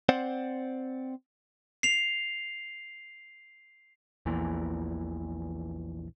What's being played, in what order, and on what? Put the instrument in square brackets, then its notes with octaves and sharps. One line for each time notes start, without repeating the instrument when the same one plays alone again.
[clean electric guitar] C4 C5 D5 F#5
[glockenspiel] C7 F7
[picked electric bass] A#1 E2 A#2 E3